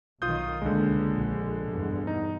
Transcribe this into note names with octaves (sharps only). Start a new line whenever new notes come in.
B1 D#3 F4 D#6 G6
C#2 D3 G#3 A#3
A#1
E2 G2 B2
D#4